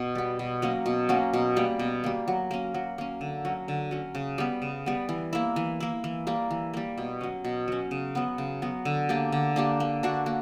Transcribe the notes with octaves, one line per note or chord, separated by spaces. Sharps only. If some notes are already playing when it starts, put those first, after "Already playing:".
Already playing: B2
G3 B3
B2
F#3 A#3 C#4
B2
F#3 A#3 C#4
B2
G3 A#3
B2
G3 A#3
F#3
A#3 C#4
F#3
A#3 C#4
D3
F#3 C#4
D3
F#3 C#4
C#3
G3 B3
C#3
G3 B3
E3
A#3 E4
E3
A#3 E4
E3
G3 A#3
E3
G3 A#3
B2
F#3 C#4
B2
F#3 C#4
C#3
F#3 B3
C#3
F#3 B3
D3
A#3 D4 G4
D3
A#3 D4 G4
A#3
D4 F#4
A#3